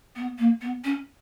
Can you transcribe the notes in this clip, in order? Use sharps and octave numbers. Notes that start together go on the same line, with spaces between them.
B3
A#3
B3
C#4